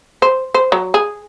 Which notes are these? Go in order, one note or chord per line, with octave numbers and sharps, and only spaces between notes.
C5
C5
F#3
G#4